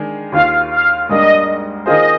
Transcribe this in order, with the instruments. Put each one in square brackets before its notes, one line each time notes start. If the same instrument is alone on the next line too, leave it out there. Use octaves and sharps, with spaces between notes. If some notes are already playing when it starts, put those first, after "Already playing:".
Already playing: [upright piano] D#3 G#3 D4 G#4
[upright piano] D#2 D#3 A#3 F4 [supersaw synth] F5
[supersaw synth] F5
[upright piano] G#2 G3 A#3 D4 [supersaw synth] D#5
[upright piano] D#3 A#3 F4 G#4 C5 [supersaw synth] D#5